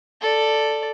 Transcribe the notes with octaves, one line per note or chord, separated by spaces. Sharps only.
A4 D5